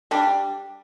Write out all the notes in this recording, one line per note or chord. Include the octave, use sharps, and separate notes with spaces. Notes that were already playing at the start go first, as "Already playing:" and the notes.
G3 D4